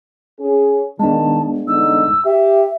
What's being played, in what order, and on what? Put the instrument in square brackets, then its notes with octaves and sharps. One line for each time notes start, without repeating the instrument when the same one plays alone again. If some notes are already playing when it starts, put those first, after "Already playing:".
[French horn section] C#4 G#4
[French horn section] D#3 [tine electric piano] G#3 B3 D4 [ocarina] A5
[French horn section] D3 E3 D#4 [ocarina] E6
[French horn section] G4 [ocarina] E5